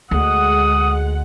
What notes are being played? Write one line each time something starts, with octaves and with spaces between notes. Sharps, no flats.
D2 G#3 F#5 D#6